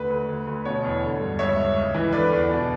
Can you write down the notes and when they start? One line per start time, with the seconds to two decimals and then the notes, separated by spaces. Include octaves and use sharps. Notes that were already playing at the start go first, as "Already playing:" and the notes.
Already playing: D2 B4
0.10 D2
0.29 D2
0.47 D2
0.65 B2 C#5
0.84 E2
1.03 D3
1.20 G2
1.39 C#2 C#5 E5
1.57 C#2
1.76 C#2
1.94 E3
2.12 D3 B4 D5
2.32 E2
2.49 B2